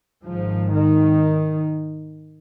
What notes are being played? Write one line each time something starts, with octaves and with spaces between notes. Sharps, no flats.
G#1 G#2 F3
D#3